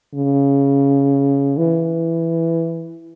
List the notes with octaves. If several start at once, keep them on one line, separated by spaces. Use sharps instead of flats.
C#3
E3